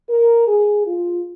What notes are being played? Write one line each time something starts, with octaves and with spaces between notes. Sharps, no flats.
A#4
G#4
F4